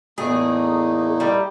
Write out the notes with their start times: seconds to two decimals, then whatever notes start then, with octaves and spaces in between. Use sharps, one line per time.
0.18 E2 A2 A3 A#3 D#4 G#4
1.20 G3